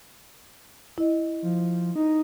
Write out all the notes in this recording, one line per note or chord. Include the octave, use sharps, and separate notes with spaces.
E4 D#5
F3
D#4